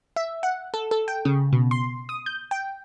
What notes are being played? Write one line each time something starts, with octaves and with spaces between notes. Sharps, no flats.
E5
F#5
A4
A4
G5
C#3
B2
C6
D#6
G6
G5